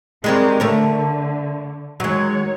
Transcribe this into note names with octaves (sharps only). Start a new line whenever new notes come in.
D#3 G3 G#3 C4 G4 A#4
D3 A3 A#4 C#5
D#3 F#3 G#3 C#5